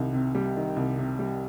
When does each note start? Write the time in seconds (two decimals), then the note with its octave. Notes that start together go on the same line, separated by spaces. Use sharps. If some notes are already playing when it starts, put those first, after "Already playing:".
Already playing: C2 D#3 G3
0.13 C3
0.35 G3
0.56 D#3
0.76 C2
0.98 C3
1.19 G3